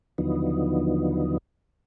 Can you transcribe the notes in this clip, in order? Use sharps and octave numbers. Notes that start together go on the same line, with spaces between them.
D#2 D3 F3 F#3 B3 D#4